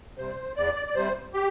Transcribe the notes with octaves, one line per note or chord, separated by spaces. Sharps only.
C3 G3 C5
E2 D5
D5
D5
C3 G3 C5
G4